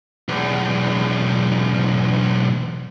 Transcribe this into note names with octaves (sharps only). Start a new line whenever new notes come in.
B1 E2